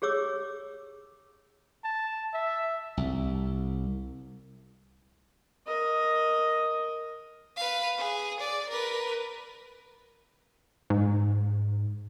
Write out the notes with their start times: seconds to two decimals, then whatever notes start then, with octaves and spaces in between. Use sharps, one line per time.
0.02 G4 G#4 C#5 D6 E6
1.84 A5
2.34 E5
2.97 C2
5.67 A#4 D#5
7.57 B4 F5
7.98 G#4
8.40 D5
8.70 A#4 B4
10.90 G#2